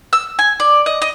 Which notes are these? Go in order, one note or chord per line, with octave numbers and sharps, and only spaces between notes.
E6
G#5
D5
D#5
D#5